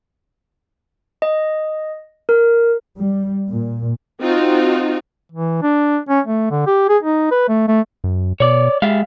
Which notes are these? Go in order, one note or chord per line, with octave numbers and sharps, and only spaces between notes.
D#5
A#4
G3
A#2
C4 D#4 F4 F#4
E3
D4
C#4
A3
D3
G4
G#4
D#4
B4
A3
A3
F#2
B2 C#5 D5
G#3 G4 E5 F5